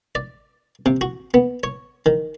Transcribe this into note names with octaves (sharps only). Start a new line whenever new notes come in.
D5
C3
F#4
B3
C#5
D#3